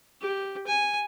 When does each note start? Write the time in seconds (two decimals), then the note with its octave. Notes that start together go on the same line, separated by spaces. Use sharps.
0.22 G4
0.67 G#5